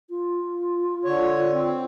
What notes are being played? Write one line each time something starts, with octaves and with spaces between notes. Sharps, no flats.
F4
D3 C#5
C4